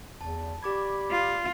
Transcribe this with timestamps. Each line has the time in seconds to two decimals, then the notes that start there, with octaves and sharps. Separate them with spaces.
0.21 E2 A5
0.63 G4 D5 B5 D6 G#6
1.11 F4